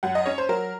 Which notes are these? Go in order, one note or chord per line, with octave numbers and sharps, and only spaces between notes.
F#2 F#5
D#5
C#4 C#5
C5
F#3 A#4